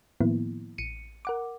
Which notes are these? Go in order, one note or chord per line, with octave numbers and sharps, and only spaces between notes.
A2 D#3 F3 A#3 B3 E4
A1 C#7 D#7
A#4 F#5 D6